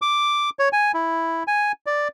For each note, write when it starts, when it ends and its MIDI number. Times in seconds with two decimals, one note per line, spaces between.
0.02 0.50 86
0.59 0.69 73
0.73 0.92 80
0.94 1.43 64
1.47 1.72 80
1.86 2.08 74